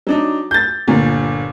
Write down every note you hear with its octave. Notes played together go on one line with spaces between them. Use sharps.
F#3 D4 D#4
G6 A6
G1 A#2